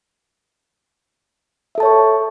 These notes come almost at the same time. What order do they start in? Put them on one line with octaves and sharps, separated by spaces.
E5 A4 A5 C#5 C#6